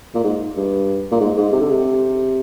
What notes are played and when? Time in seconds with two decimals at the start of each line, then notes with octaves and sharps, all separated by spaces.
0.15 A#2
0.24 G#2
0.57 G2
1.11 A#2
1.20 G#2
1.37 G#2
1.52 C3
1.61 D3
1.71 C3